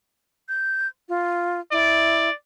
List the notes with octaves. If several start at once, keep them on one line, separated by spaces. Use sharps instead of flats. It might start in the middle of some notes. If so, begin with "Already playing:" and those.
G6
F4
E4 D5